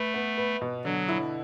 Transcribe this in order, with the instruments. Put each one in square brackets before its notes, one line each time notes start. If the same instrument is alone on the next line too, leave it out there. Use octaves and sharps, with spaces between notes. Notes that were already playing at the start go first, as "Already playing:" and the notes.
Already playing: [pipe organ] A3 [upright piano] B4
[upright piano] B3
B4
B2
[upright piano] D3 [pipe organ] F#3
[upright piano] E4